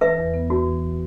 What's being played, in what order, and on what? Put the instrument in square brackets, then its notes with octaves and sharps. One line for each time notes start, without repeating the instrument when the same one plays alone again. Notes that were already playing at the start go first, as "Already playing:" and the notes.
[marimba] E3 [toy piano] B4 E5
[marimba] E2
B3
[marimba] E2 [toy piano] F#4
[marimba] E3